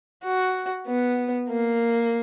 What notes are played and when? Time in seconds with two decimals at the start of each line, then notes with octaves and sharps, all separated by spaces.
0.24 F#4
0.87 B3
1.50 A#3